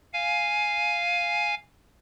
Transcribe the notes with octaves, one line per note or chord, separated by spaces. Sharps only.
F5 G#5